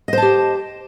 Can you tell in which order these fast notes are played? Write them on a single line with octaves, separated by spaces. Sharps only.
D#5 C5 A5 G4